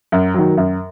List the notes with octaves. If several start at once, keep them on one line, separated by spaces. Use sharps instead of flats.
F#2
D#3 F#3
F#2